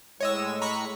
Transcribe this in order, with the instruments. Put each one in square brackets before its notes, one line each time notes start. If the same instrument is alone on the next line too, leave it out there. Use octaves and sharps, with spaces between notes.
[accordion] A2 G#3 [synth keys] C#5 D#5 E6
[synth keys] A#5 B5 C#6